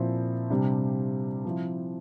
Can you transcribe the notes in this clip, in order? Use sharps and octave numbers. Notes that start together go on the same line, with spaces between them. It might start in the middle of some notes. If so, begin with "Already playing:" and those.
Already playing: A#2 F3 C4 E4
C3 G3 D4
F3 C4 E4